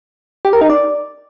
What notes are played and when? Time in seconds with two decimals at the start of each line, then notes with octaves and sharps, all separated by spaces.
0.45 G4
0.53 A#4
0.61 D#4
0.70 D5